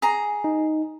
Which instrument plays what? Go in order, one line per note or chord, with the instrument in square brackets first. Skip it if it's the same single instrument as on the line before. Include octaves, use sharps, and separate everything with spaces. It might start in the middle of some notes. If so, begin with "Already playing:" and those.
[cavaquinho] G#4 A#5
[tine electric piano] D#4